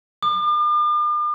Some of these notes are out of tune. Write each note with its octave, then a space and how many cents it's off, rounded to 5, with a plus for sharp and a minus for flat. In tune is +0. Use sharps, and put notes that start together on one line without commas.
D6 +45